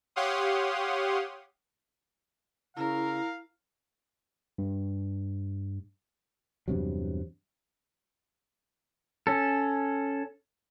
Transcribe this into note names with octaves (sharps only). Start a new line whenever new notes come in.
G4 C#5 F5 F#5 C6 D#6
C#3 E4 A#4 F5
G2
E2 G2 C3 F#3
C#4 A4